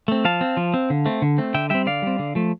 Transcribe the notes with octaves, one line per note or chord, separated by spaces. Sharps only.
A3 C4
F3 F5 A5
C4
F3
C4
D3
A3 C4
D3
A3 C4
D3 E5 G5
G3 C4 E5 G5
D3 D5 F5
G3 C4
D3
F3 A3